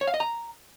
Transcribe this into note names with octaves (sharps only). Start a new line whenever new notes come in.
C#5
F5
D#5
A#5